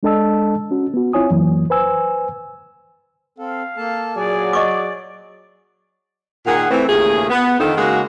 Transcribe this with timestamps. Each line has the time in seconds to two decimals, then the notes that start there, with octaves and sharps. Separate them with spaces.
0.03 G#3 D4 A4 D#5 A5 E6
0.71 C#4 F#4
0.94 B3 F#4
1.13 C4 E4 F4 C#5 G#5 D#6
1.30 F#2 E3 F#3 A#3
1.70 B4 C5 G#5 E6
3.38 C4 A4 F5
3.77 A#3 A4 A5
4.15 A#2 F#3 G#4 D5 G#5
4.53 D#5 C#6 D6
6.46 A#2 D#3 G#4 F#5
6.70 E3 A3 C4
6.88 D#2 A#2 C#3 A3 G#4
7.30 B3
7.58 F2 D3 D#3 F3 D#4 A4
7.76 C#3 G#3 A#3 D#4 F#4